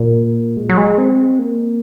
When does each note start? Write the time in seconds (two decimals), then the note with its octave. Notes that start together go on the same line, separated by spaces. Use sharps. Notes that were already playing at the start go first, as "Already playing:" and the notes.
Already playing: A#2
0.57 G#3
0.69 F#3
0.77 G#3
0.98 C4
1.39 A#3